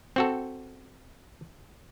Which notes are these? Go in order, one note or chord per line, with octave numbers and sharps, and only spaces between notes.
C4 F#4 A4